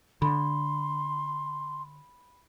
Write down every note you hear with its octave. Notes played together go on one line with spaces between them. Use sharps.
D3 B5 C6